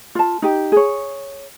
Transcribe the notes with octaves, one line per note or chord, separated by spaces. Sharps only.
F4 A5
D#4 G4
G#4 C#5